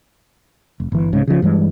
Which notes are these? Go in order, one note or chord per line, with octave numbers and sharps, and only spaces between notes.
F1
G1 E3
C2 G#2 C#3
C#3 F3
G2 E3 G#3